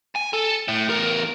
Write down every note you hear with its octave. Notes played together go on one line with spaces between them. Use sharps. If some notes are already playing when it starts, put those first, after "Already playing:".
G#5
A4
A2
E2 A#4